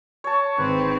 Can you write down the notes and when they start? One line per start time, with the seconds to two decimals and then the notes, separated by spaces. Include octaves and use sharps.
0.24 C#5 A5
0.58 G#1 C4 B4